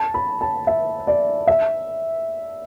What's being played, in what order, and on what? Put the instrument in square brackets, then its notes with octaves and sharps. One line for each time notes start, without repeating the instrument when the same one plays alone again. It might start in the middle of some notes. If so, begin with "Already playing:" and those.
Already playing: [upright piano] A5
B5
A5
E5
D5
E5